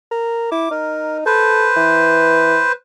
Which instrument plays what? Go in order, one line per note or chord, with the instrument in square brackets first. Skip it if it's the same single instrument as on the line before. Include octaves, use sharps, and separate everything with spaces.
[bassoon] A#4
[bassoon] E4 [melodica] D6
[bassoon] D#4 [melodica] A#4
[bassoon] A4 [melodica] B4 C5
[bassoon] E3